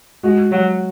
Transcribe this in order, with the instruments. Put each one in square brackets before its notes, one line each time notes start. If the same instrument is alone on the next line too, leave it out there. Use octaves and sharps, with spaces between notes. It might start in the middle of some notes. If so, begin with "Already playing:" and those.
[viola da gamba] G#3 [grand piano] F#4
[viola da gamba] F#3